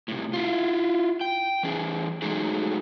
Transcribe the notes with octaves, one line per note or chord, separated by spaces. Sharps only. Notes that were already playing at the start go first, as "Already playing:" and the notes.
A2 C3
E4 F4
G5
E3 C#4 G#4
F#3 G#3 A3 D#4 G#4